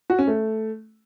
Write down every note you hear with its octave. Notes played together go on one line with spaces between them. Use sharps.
F#4
C#4
A3